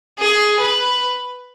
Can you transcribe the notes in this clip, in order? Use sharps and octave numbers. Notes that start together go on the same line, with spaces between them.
G#4
B4